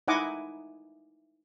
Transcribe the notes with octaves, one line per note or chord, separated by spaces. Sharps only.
D#4 E4 D#5 F#5 G#5 D6